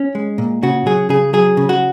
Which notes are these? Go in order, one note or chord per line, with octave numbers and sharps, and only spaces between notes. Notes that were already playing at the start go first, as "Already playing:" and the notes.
Already playing: C#4
G#3
A#2
C#3 F#4
F#3 G#4
C#3 G#4
F#3 G#4
C#3
F#4